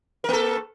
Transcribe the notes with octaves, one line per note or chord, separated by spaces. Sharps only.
A#3 A4 A#4